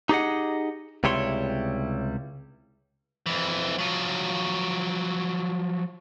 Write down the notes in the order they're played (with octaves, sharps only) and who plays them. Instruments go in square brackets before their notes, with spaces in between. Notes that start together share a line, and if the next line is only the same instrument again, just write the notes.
[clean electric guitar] D#4 G4 G#4 D5 D#5 F#5
C#2 C3 G3 E4 C#5 C6
[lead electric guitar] F2 E3
F3 F#3